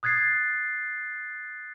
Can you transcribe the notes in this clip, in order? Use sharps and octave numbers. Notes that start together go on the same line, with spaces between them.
D#6 F#6 G#6 A6 C7